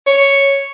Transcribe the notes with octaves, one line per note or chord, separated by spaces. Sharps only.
C#5